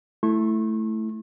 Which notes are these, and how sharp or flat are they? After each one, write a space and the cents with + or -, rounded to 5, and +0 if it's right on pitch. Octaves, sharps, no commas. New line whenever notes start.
A3 +0 E4 +0 C#6 -40